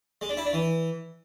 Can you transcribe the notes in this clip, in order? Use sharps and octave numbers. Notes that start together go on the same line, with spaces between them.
G#3
D4
E4
D4
E3